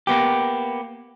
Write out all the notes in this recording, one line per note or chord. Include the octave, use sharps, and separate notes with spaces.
A#3 B3 G4